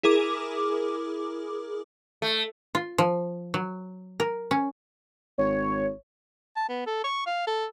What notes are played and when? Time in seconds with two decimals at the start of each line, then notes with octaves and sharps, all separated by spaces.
0.03 E4 G#4 A#4 D6
2.22 A3
2.75 F4
2.98 F3
3.54 F#3
4.20 A#4
4.51 C#4
5.38 G#1 C#5
6.56 A5
6.69 B3
6.87 A4
7.04 C#6
7.26 F5
7.47 A4